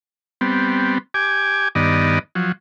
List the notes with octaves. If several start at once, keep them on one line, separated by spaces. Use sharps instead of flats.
G3 B3 C4
G4 G#5 D6
G2 D#3 B3 D5 D#5
F3 F#3